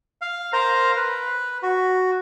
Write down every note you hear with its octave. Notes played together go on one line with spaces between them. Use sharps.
F5
A#4 C5 F5 A#5
B4
F#4